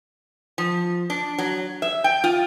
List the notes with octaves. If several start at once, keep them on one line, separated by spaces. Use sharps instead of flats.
F3
D4
F#3
E5
G5
F4